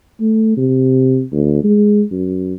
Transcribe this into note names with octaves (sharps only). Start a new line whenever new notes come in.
A3
C3
D2
G#3
F#2